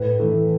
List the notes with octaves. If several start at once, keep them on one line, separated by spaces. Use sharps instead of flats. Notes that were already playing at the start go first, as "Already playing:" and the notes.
Already playing: A2 B4
E3 A3